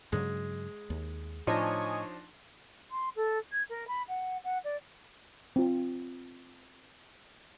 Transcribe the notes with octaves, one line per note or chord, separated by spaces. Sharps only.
G2 C#3 F#3 G#3
D#2
A2 F3 D4 D#4 C#5 D#5 G#5
C6
A4
G#6
A#4
B5
F#5
F#5
D5
C4 F4